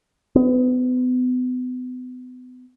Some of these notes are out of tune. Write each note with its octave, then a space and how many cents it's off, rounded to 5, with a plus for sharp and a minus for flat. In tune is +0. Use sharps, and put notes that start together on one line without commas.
B3 +35